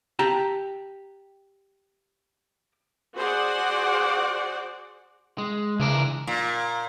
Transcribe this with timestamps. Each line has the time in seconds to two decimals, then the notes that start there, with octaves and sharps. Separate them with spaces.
0.19 G4 A5 A#5
3.15 F#4 G#4 C5 D5 F#5
5.38 G#3
5.80 C#3 E3 D4 A#4
6.27 A#2